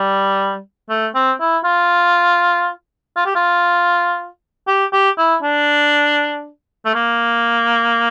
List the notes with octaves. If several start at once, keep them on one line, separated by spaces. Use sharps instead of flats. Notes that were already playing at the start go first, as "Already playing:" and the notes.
Already playing: G3
A3
C4
E4
F4
F4
G4
F4
G4
G4
E4
D4
A3
A#3